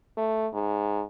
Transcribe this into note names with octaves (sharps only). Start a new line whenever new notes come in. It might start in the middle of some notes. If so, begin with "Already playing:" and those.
A3
G#2